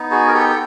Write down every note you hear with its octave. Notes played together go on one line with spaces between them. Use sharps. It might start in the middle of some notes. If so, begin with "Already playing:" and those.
Already playing: B3 D#4
F#4 G#4
A#4
G4 A4
A4